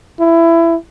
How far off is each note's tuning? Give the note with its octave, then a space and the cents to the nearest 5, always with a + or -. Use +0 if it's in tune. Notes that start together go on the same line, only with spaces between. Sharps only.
E4 +20